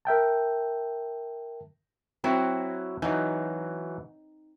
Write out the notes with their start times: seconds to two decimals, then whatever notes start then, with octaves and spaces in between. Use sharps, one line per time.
0.05 A#4 E5 G5 A5
2.24 F#3 C4 E4 F#4
3.02 E3 F#3 D#4